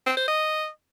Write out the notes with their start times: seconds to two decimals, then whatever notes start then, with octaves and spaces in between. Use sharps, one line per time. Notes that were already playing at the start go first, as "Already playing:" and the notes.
0.06 C4
0.17 C5
0.28 D#5